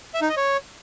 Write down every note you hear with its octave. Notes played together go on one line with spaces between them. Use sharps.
E5
D#4
D#5
C#5